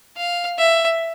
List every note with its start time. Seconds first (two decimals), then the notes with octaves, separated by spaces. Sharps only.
0.17 F5
0.58 E5